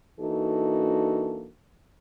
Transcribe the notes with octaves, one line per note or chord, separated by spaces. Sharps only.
E3 A#3 D4 D#4 F#4 A4